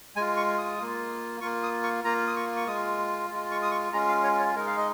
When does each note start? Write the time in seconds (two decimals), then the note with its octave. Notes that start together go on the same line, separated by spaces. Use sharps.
0.16 G#3 F4 G#5
0.37 C#6
0.58 D#6
0.78 A#3 F4
1.41 A#3 F4 C#6
1.63 D#6
1.83 C#6
2.04 A#3 F4 A#5
2.27 D#6
2.36 C#6
2.56 C#6
2.67 G#3 F4 D#6
3.30 G#3 F4
3.51 C#6
3.62 D#6
3.71 C#6
3.93 G#3 C#4 F4 A#5
4.08 F5
4.23 C#5
4.40 C#5
4.55 G#3 D#4 A#4
4.67 F5
4.77 D#5